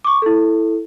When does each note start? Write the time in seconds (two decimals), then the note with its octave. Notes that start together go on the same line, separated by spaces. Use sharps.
0.05 C#6 D6
0.22 E4 A4